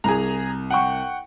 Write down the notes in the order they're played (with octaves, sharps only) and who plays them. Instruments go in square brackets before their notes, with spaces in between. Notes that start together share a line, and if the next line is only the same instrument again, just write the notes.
[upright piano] C2 [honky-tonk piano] G#4 A#5
[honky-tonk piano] F#5 G5 C#6